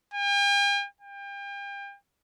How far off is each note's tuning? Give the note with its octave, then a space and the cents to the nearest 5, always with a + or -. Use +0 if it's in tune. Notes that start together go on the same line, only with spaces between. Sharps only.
G5 +45
G5 +35